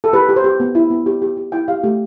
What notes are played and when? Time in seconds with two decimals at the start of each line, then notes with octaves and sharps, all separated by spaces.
0.04 A4
0.13 G4 B4
0.29 G4
0.36 C5
0.44 G4
0.60 B3
0.75 E4
0.90 B3
1.06 G4
1.22 G4
1.37 G4
1.52 E4 G5
1.68 G4 F5
1.83 A3 G4